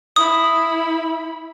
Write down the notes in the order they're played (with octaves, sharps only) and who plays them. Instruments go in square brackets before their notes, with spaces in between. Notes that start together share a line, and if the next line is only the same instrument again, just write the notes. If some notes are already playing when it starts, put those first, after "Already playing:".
[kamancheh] E4 B5 [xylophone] D#6